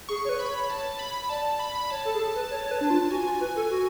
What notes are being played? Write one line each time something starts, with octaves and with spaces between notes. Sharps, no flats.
G#4 C#6
C#5
B4
B5
C#5
A5
B5
D5 A5
B5
C#5 A5
A4
G#4
A4
B4
C#5
C#5
B4
D4
F4
F#4 G#5
F4
B4
A4
F#4